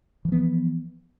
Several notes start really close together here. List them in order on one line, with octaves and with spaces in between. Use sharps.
E3 F3 B3